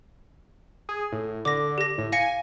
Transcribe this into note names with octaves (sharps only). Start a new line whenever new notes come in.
G#4
A2
D3 D6 A#6
G4 A#6
A2
F5 G#5 A#6 C#7